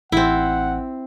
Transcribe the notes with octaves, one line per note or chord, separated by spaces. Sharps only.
A1 C4 E4 F#5